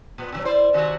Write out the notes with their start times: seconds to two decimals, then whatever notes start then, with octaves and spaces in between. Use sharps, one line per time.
0.18 A#2 B3
0.32 B2 D#3 F#3
0.45 E4 C5 D5
0.73 C3 D#3 F#4